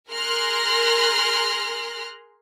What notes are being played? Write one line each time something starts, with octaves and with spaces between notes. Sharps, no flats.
G#4 A#4 C6 F6 F#6 A#6